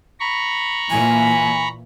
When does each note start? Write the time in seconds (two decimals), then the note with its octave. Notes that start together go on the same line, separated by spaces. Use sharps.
0.20 A#5 B5 C#6
0.91 A#2 E3 G#5